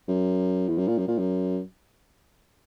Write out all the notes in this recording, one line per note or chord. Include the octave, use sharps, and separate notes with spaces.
F#2
E2
F#2
A#2
F#2
A#2
F#2